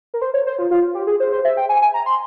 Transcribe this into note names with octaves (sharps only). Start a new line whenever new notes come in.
A#4
C5
C#5
C5
F4
F4
G4
G#4
C5
C5
E5
G5
G#5
G#5
A#5
C6